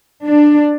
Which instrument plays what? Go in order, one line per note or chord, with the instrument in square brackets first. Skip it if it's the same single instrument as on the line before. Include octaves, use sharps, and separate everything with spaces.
[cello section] D4